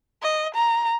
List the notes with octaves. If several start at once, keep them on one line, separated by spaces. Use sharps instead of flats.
D#5
A#5